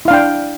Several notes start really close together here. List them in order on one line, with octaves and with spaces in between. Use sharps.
E4 F5 D4 G5